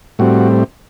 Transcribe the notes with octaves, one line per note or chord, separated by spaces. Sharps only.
A2 G3 C4 F#4